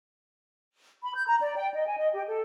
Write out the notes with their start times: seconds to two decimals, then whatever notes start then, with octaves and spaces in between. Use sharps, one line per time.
1.02 B5
1.15 G6
1.27 A#5
1.41 D5
1.57 G5
1.73 D#5
1.86 G#5
1.98 D#5
2.14 G4
2.27 A4